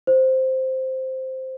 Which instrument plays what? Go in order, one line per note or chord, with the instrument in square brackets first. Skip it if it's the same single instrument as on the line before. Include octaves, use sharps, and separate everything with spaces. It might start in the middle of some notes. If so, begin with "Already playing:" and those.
[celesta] C5